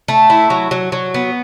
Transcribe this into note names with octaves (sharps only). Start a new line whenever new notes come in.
A3
E4
F#3
F#3
F#3
B3